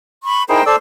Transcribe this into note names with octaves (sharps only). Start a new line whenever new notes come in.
B5 C#6
D#4 E4 G#4 A#4 C5 G5
A4 C5 D5 E6